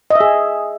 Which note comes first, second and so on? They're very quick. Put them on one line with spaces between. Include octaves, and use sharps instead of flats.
D#5 E5 G#4